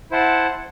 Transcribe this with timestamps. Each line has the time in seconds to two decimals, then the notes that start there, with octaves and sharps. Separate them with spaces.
0.11 E4 C5 F#5 A5